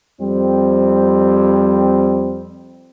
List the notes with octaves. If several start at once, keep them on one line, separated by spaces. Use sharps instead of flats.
F2 G3 C4